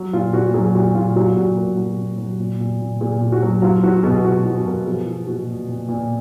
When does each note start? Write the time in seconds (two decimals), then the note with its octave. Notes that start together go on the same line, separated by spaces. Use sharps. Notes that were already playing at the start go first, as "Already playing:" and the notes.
Already playing: F#3
0.13 A#2 F4
0.33 A#2 F#4
0.54 F#3 G#4
0.75 A#2 F#4
0.95 A#2 F4
1.16 F#3 F#4
1.36 A#2 F#4
1.56 A#2 A#4
1.77 F#3
1.97 A#2
2.18 F#3
2.40 A#2
2.60 A#2
2.81 A#2
3.01 A#2 G#4
3.21 A#2
3.32 F#4
3.43 F#3
3.62 F#3 F4
3.83 F#3 F#4
4.03 B2 G#4
4.24 B2 F#4
4.45 F#3 F#4
4.65 B2 A#4
4.86 F3 G#4
5.06 F3 F4
5.27 A#2 F#4
5.47 A#2
5.68 A#2
5.89 A#2